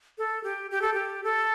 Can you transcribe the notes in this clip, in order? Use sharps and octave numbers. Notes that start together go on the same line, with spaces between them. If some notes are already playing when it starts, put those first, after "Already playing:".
A4
G4
G4
A4
G4
A4